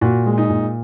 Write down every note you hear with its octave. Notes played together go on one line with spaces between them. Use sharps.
A#2 F#4
G#3
D#4
A#2